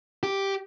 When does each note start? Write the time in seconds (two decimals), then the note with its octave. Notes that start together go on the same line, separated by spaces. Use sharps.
0.23 G4